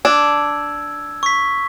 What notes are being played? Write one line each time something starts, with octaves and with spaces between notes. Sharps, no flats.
D4 E6 G#6
C#6 B6